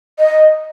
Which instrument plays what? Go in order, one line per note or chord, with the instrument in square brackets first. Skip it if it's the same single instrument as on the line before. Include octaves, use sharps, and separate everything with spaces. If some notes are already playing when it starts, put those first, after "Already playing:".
[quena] D#5